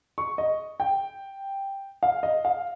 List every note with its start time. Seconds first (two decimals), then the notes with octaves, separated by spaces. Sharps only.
0.18 C#6
0.38 D#5
0.80 G5
2.03 F5
2.23 D#5
2.45 F5